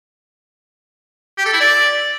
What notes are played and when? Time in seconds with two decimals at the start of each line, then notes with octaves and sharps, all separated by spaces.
1.38 G4
1.45 A4
1.53 E4
1.60 D5